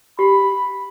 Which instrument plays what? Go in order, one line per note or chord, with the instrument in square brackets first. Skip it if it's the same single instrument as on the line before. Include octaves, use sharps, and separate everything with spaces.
[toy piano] G4 [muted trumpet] B5